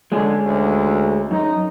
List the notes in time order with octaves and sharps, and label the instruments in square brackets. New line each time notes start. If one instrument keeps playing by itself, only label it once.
[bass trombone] D3 [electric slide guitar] G#3 C#4 G#4
[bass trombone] D2
[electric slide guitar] F#2 [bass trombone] D#4